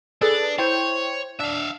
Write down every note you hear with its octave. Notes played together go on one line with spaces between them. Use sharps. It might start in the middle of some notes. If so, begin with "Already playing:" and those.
D4 G#4 A4 B4
E4 C5 C#5 G5
D4 E5 F5